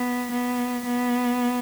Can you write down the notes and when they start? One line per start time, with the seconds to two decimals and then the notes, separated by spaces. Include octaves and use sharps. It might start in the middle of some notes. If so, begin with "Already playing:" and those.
Already playing: B3
0.31 B3
0.85 B3